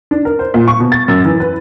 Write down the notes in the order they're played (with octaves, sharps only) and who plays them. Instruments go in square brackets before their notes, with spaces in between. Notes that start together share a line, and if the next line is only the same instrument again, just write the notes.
[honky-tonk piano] D4
A#4
C5
A#2
C#6
B2
A6
F#2
E3
B4